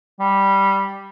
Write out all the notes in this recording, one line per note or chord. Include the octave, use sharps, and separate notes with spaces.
G3